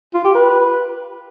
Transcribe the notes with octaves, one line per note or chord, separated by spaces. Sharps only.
F4
G4
B4